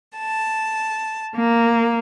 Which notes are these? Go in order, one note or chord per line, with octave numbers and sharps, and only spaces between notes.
A5
A#3